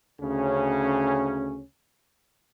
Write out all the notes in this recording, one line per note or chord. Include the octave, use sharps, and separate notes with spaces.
D2 C#3 C#4